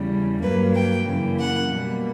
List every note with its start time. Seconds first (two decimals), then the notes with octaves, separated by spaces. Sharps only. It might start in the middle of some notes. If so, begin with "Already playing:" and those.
Already playing: E2 C#3 G3
0.43 G2 F#3 A#3 B4
0.76 G5
1.08 F#2 C#3 E3 A#3
1.40 F#5
1.73 B2 G3 A#3